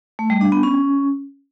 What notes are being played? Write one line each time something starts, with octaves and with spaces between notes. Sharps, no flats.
A3
G3
D4
B3
C#4